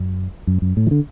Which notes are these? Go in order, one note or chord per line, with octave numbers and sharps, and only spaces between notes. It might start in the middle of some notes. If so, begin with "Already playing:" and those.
Already playing: F#2
F#2
F#2
A2
E3
D3